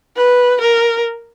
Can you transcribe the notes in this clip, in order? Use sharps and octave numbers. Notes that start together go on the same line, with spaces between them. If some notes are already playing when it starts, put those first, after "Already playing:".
B4
A#4